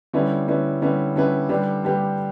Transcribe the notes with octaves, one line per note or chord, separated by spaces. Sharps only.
D3 G3 C#4 E4 B4
D3 G3 C#4 E4 B4
D3 G3 C#4 E4 B4
D3 G3 C#4 E4 B4
D3 G3 D4 G4 B4
D3 G3 D4 G4 B4